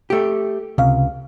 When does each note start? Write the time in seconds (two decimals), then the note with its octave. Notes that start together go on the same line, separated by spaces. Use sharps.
0.10 A3 G4
0.78 C#2 C3 F5